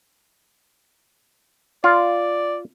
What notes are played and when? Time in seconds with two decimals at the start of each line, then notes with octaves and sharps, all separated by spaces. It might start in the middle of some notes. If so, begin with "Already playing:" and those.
1.84 F4 D5